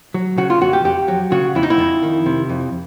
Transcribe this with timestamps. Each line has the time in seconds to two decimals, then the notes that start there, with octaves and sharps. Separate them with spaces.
0.14 F#3
0.38 C#3 F#4
0.50 F4
0.61 F2 F#4
0.73 G4
0.84 F2 G4
1.08 F#3
1.32 C#3 F#4
1.55 F2 E4
1.63 D#4
1.70 E4
1.79 F2
2.03 D#3
2.26 C3
2.49 F2